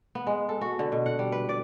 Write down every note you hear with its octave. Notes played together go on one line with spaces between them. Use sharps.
B3
G#3
A4
F#4
D3
B2
F#5
G3
B4
D5